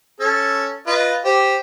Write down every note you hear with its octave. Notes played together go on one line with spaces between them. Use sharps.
C#4 A4
F4 B4 D#5
G4 C5